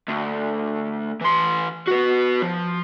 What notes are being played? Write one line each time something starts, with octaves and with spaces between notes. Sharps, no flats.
D2
E3 C6
B3 F#4
F3